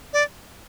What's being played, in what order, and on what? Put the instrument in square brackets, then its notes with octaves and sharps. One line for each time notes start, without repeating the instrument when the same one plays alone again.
[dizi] D5